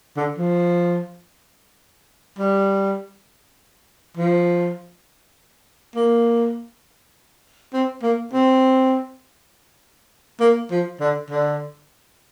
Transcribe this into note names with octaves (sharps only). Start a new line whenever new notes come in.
D3
F3
G3
F3
A#3
C4
A#3
C4
A#3
F3
D3
D3